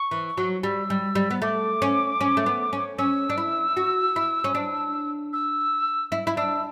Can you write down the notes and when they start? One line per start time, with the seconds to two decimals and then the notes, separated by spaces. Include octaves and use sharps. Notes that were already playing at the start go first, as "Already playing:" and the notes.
Already playing: C#6
0.11 E3
0.37 F#3
0.63 G3 E6
0.90 G3
1.15 G3
1.31 B3
1.42 A3 D6
1.82 C#4
2.21 C#4
2.37 A3
2.46 B3
2.73 C#4
2.98 C#4 E6
3.30 D4
3.38 E4
3.77 F#4
4.16 E4
4.44 C#4
4.55 D4
5.33 E6
6.12 E4
6.27 E4
6.37 D4 E6